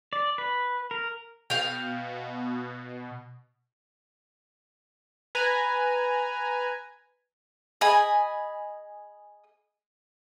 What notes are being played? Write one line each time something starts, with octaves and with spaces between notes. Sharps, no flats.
D5
B4
A#4
B2 F5 G5
B4 G#5 A#5
G#4 D#5 G#5 B5